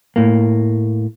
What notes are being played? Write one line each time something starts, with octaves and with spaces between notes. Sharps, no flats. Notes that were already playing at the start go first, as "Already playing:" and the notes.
A2 A#3